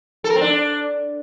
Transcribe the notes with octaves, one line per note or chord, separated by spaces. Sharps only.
A4
A#4
C4
D4